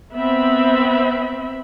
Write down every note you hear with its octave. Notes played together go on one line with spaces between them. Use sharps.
B3 C4 E5 B5